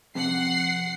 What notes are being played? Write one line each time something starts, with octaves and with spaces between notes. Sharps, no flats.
F2 C3 F#5 C7